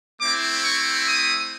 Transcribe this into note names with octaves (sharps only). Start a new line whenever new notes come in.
A3 C4 E4 D6
C#6
D#6